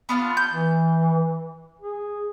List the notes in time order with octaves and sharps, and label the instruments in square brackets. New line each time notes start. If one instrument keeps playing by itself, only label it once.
[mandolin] B3 D4 F4
G6
[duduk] E3
G#4